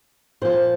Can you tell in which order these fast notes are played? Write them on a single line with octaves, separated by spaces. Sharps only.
A#2 C5 F3